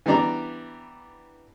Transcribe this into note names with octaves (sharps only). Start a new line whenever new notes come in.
E3 G3 B3 D4 D5 A#5